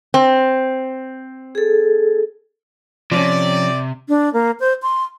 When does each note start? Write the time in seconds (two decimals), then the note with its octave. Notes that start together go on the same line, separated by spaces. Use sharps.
0.14 C4
1.55 G#4 A4
3.12 C3 F3 C#4 D5
4.09 D4
4.33 A#3
4.60 C5
4.82 C6